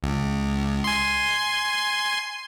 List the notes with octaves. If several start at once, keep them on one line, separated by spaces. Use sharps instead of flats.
C#2
G#5 C6